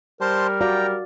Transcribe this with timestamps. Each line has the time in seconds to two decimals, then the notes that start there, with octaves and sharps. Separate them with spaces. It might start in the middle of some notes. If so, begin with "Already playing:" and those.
0.21 G3 A#4 C5 A5 C6
0.61 F#4 D5 F5 G5 A#5